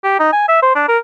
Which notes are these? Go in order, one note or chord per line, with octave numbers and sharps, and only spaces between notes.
G4
D#4
G#5
E5
C5
D4
A#4